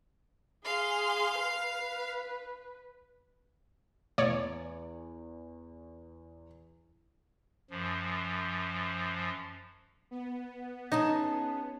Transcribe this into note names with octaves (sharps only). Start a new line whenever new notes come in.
G#4 F5 C6
B4
E2 C#5 D5
F#2 F3
B3
C#4 D#4 G#4 A5